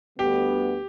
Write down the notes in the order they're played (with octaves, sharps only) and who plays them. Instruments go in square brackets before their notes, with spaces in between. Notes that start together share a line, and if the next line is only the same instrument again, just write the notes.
[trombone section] D2 D3 G3 B3 [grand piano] G4